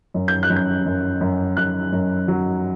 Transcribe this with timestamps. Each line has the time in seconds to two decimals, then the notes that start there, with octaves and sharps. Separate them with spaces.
0.14 F#2
0.28 G6
0.43 F#6
0.50 F#2
0.56 G6
0.86 F#2
1.21 F#2
1.57 F#2 F#6
1.92 F#2
2.28 F#3